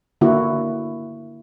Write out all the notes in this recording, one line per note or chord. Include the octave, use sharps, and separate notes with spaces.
D3 A#3 E4 F#4